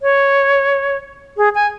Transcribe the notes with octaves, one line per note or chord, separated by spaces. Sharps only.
C#5
G#4
G#5